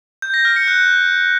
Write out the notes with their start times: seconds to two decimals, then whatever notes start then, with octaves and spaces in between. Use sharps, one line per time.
0.22 G6
0.34 A#6
0.45 F6
0.56 C#7
0.68 F#6